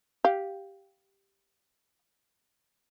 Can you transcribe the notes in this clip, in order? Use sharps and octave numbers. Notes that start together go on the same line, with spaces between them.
G4 F5